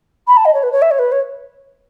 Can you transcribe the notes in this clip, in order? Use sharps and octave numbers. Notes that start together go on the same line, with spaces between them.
B5
A5
D#5
C#5
B4
C#5
E5
C#5
B4
C#5